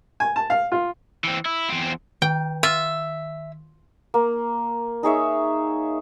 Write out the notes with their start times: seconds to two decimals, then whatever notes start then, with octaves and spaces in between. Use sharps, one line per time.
0.20 G#5
0.36 A5
0.50 F5
0.72 F4
1.24 E3 C4
1.45 E4
1.69 E2 C4
2.22 D#3 G5
2.63 F4 E5
4.14 A#3
5.03 D#4 G#4 C#5 E5